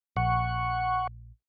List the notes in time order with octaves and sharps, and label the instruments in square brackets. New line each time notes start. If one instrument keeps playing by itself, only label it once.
[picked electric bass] A#1 [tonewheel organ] F#5 C#6